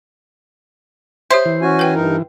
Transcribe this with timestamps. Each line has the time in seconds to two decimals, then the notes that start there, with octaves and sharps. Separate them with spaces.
1.31 G4 C5 C#5 E5
1.45 E3
1.62 C#4 F#4 G#5
1.79 B4 G5
1.95 G2 D#4 A#4